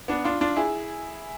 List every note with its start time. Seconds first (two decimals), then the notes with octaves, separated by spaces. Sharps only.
0.08 B3 D4
0.24 D4 F4
0.41 D4 F4
0.56 E4 G#4